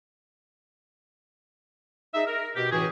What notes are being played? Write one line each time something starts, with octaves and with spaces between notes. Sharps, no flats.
D#4 G#4 E5
A#4
B2 G4
C#2 A2 E3 F#4 G#4